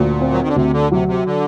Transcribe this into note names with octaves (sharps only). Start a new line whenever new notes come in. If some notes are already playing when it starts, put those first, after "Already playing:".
Already playing: D2 A#2
C4
F#3
D#3
D3
D2 C3
D3
C3 F#3
C3
D3